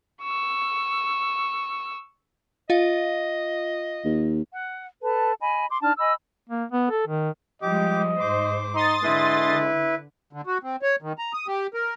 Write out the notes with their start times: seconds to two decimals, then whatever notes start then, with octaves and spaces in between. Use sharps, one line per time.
0.22 C#6 E6
2.70 F4 D#5 F5
4.05 D#2
4.53 F#5
5.02 A4 B4 A5
5.41 D#5 G#5 B5
5.69 C6 D6
5.82 D4 D#4 A5 F6
5.98 D#5 G#5 B5 E6
6.49 A#3
6.72 B3
6.90 A4
7.07 D#3
7.62 F3 G3 G#3 G4 D#5 D6
8.20 G#2 C5 D6
8.75 D#4 C6 D#6 A6
9.03 D3 G#3 E4 B4
10.33 D3
10.47 F#4
10.64 C4
10.82 C#5
11.02 D#3
11.18 A#5
11.33 D#6
11.48 G4
11.74 A#4